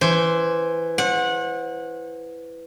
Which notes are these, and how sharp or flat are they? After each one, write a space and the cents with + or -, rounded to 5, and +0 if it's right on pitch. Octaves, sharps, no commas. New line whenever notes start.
E3 +10 C5 +0
C5 +35 F#5 -20